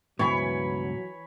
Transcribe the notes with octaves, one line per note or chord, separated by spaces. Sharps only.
C#2 G2 B2 E3 F#3 C#5 G#5 B5